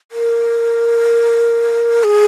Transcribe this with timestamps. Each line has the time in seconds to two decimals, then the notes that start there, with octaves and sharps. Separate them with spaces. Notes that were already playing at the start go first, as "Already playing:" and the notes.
0.12 A#4
2.04 G#4